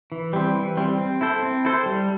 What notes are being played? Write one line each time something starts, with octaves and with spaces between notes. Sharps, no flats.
E3
G3 C4
E3
G3 C4
C4
E4 A4 C5
C4
E4 A4 C5
G3